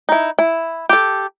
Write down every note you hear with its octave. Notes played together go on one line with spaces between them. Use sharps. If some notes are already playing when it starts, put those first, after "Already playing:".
D#4 E4
E4
G4 A4